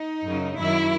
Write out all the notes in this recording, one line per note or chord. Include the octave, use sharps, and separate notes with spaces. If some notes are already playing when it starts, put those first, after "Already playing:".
Already playing: D#4
F#2 C#3 F#3
F#2 D#3 F#3 E4